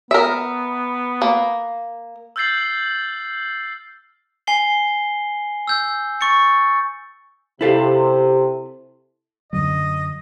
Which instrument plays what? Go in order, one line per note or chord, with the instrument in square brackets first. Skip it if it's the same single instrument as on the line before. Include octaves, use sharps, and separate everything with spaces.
[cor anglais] B3 [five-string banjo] A#4 E5
[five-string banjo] A#3
[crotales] E6 F6 G6 A6 C7 F#7
[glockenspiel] G#5 C7 G7
E6 G6
C#6 A6 C#7
[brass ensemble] C3 [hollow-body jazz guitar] E4 A4 F5
[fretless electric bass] F#2 D3 F#3 [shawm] D#5